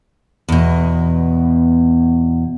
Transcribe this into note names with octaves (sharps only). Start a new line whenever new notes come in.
E2 B2